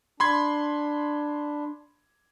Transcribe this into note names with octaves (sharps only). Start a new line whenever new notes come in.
D4 B5 C6 G#6